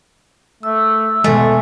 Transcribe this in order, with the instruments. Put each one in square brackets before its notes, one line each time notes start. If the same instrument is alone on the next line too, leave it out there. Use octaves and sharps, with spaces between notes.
[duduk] A3 [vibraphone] E6
[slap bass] B2 G#3 [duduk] D3 [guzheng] A3 [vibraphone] G#5